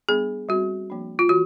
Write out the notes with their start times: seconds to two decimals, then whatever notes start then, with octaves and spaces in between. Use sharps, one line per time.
0.09 G3 B3 D4 G#4
0.49 G3 C4 F#4
0.90 F3 A#3 D4
1.19 F4
1.29 E3 F#4